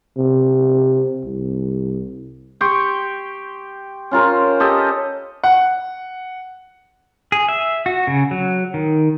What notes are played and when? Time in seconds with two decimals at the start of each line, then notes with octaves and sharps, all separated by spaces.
0.17 C3
1.24 C2
2.61 G4 G5 C6 C#6
4.11 C#4 F4 A#4 C5
4.60 G4 A4 D#5
5.44 F#5
7.32 G#4
7.48 E5
7.86 F#4
8.07 C#3
8.31 F#3
8.74 D#3